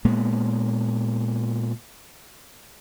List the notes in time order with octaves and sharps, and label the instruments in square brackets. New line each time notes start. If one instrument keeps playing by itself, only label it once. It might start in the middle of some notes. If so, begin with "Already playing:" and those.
[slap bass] A#2 G#3 A#3 B3